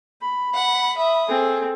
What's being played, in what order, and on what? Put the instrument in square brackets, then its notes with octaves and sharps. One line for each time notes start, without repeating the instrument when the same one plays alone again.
[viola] B5
[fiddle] F#5
E5 D#6
[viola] C4 A4 [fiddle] G#4